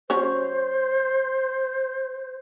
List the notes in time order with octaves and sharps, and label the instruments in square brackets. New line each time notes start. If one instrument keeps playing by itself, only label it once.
[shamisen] F#3 C#4 C#5 [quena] C5